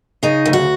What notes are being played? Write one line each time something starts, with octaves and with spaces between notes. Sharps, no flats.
C#3 D#4
D2
F#4